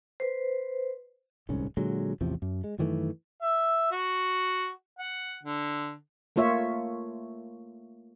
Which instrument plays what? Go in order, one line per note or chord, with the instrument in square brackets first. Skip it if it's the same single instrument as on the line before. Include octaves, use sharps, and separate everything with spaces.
[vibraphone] B4 C5
[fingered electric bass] D1 C2 G#2 C#4
A#2 D3 F#3 G#3
A1 E2 C3 F3
F#2
G#3
F#2 D#3 E3 A3
[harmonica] E5
F#4
F#5
D3
[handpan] A3 A#3 F4 C#5 E5